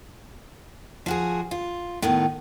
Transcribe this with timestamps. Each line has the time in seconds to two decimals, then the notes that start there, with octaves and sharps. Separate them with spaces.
1.06 F3 F#4 G#4
1.51 F4
2.02 A2 D#3 B3